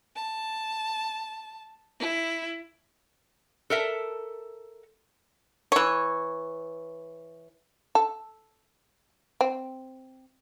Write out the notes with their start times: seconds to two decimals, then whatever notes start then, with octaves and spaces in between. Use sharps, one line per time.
0.15 A5
2.00 E4
3.70 A4 A#4 E5
5.72 E3 C#5
7.95 A4
9.41 C4